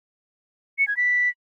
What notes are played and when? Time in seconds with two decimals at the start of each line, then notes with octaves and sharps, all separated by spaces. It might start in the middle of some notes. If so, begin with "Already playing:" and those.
0.79 C#7
0.88 G#6
0.97 B6